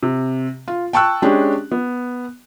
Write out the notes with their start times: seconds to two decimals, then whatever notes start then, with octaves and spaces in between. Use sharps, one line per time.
0.03 C3
0.68 F4
0.93 G5 A5 C#6 E6 F#6
1.22 G#3 C#4 D4 G4
1.72 B3